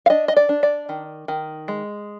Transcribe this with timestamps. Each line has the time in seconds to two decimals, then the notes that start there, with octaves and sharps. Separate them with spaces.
0.06 F5
0.10 D4 D#5
0.28 D#5
0.36 D5
0.49 D4
0.63 D5
0.89 D#3
1.28 D#3
1.68 G#3